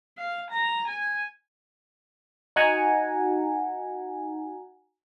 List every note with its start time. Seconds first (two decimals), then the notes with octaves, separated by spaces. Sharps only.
0.18 F5
0.50 A#5
0.87 G#5
2.56 D#4 F#4 F#5 G#5 A#5